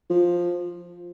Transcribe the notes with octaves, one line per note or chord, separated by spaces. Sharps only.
F3